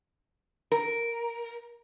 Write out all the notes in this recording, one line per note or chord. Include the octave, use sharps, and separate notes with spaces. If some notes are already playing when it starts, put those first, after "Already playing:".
A#4